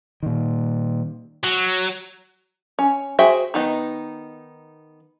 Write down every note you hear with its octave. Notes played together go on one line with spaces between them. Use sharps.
A#2 D#3
F#3
C#4
F#4 G#4 C5 E5 G5
D#3 B3 D#4